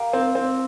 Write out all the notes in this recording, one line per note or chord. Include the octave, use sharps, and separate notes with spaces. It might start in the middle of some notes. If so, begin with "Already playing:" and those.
Already playing: G4 A#4 F5
C4
C4